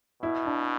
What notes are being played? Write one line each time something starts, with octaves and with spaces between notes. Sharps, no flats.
B2 E4
D4